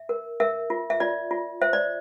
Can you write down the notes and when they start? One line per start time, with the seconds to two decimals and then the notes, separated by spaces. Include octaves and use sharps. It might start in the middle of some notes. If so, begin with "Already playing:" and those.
Already playing: E5
0.09 A#4
0.40 A#4 E5
0.70 F4
0.90 E5
1.00 F4 D5
1.31 F4
1.62 C5 E5
1.73 D5